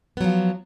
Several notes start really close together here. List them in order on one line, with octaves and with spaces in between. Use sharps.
B3 F#3 F3